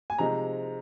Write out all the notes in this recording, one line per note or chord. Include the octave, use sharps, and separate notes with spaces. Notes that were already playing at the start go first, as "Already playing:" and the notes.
G#5
C3 F3 G#3 D#4 A#5